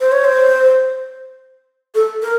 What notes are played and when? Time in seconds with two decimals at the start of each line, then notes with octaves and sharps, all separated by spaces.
0.01 C5
0.12 C#5
0.24 C5
1.95 A4
2.22 A#4